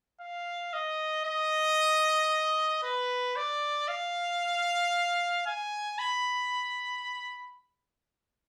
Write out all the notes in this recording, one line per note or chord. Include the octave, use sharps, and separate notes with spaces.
F5
D#5
D#5
B4
D5
F5
G#5
B5